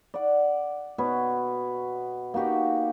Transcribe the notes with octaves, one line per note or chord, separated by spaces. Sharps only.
D5 F#5
B2 B4 C#5
A#3 D#4 F#4 G4